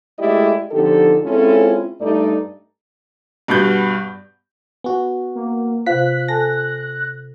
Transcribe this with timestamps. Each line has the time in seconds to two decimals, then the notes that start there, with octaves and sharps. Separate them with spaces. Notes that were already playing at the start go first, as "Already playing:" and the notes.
0.19 G#3 A3 E4 G4 D5 D#5
0.72 D3 F3 C4 D#4 G4 A4
1.24 G#3 C4 C#4 E4 F4 A4
2.01 G2 A3 D#4 A4 D5
3.48 G2 B2 B3 B5 G6
4.84 B3 F#4 G#5
5.35 A#3
5.86 C3 F4 B4 C5 F5 F#6 B6
6.28 A4 G#5 A5 A#6